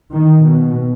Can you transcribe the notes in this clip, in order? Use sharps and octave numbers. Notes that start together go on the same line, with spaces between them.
D#3
B2